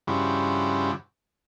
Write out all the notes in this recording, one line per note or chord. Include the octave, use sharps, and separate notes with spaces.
G2 C#3 F3 E4 F#4 G4